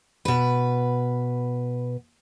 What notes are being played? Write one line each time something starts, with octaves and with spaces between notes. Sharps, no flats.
B2 B4